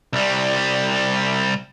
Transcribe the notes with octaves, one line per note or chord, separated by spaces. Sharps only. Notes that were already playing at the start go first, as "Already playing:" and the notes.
C2 G3